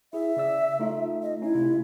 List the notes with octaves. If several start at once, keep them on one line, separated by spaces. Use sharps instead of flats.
E4 G#4 E5
C#3 D5 E6
A3 D#4 F4
D#5
C#4 D#4 E4
C3 A3 F4